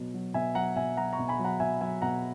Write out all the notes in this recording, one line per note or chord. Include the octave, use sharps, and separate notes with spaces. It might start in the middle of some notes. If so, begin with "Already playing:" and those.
Already playing: B2 F#3
F#3
B2 E5 G#5
F#3 F#5 A#5
B2 E5 G#5
F#3 F#5 A#5
A#5 C#6
B2
G#5 B5
F#3
F#5 A#5
B2 E5 G#5
F#3 E5 G#5
B2 F#5 A#5